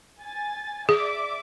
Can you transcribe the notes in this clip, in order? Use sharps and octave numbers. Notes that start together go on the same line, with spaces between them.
G#5 A6
G#4 D5 E5 D6